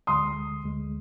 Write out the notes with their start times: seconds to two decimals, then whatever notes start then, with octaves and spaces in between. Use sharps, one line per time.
0.07 D2 D3 G#3 C6 D#6
0.63 D2 D3 G#3